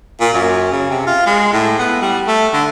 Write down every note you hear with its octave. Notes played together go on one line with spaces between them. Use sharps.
A#2
F#2
C#3
C3
F4
G#3
A2
B3
G3
A3
D3